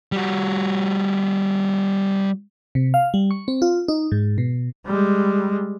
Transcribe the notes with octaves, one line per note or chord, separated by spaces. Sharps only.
G3 F#4
C3
F5
G3
C#6
C4
F4
D#4
G#2
B2
G3 G#3